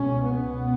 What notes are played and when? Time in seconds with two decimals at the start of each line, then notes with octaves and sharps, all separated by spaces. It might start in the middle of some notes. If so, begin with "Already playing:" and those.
Already playing: C#2 B2 C#4
0.23 B3